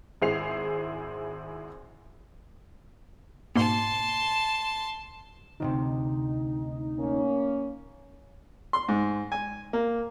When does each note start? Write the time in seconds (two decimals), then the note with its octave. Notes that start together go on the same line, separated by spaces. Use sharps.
0.22 G#1 E4 G#4 C5 C7 F7
3.56 G#2 B2 A#3 A5 C6
5.60 D2 A2 C3 D#4
6.99 A#3 C#4
8.73 C6
8.88 G#2
9.32 G#5
9.73 A#3